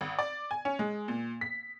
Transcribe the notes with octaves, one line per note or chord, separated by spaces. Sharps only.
G#1
D5
G#5
C#4
G#3
A#2
B6